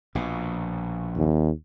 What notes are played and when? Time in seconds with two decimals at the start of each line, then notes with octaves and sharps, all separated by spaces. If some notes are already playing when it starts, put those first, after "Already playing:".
0.15 A#1 B2
1.16 D#2